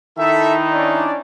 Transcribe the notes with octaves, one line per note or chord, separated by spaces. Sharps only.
D#3 D#4 E4 A4 E5
C#4 D4 D5